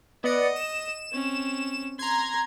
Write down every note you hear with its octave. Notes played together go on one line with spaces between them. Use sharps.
B3 D5 D#5 C#7
E7
C4 C#4
A#5 C6 G#6